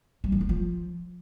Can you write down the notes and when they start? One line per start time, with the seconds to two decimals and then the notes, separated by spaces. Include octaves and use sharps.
0.24 G3
0.32 D#3
0.41 G#3
0.49 F3